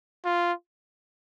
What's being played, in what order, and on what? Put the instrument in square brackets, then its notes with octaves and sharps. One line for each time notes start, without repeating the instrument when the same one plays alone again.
[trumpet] F4